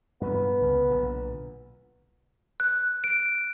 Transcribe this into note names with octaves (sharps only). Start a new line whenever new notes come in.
G2 A#2 E3 B3
C#2 C#3
B1 A#2 D3
F#6
D7